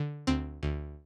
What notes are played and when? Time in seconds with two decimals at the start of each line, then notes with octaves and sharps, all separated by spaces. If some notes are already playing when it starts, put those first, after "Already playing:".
Already playing: D3
0.27 D2 C4
0.63 D2